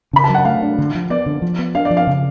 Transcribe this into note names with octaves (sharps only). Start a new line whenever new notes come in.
C#3 B5
A5
F#3
F#5
A3 F5
D4
D3
F3
B3 D5
D3
F3
B3
D4 F5
D5
F3
F5
C#3